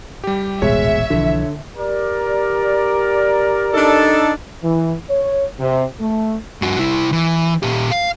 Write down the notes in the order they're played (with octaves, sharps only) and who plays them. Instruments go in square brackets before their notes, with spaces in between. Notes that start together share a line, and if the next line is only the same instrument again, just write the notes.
[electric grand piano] G3 G4
[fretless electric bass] D#1 A1 B2 [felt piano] G#3 [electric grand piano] C#5 [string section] E5
[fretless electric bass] B1 E3 F3 [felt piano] D3
[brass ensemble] G4 A#4 D5
[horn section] D4 D#4 A4
[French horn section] E3
C#5
C3
A3
[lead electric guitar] G2 F#4
C2 E4
E3
A#2 G4
F5